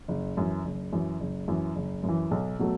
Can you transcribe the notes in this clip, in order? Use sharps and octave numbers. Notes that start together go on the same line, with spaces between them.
F#1
F#2 E3
F#1
F#2 E3
F#1
F#2 E3
F#1
F#2
E3
B1
B2 F#3 A3